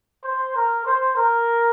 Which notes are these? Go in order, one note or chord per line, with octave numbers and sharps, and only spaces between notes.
C5
A#4
C5
A#4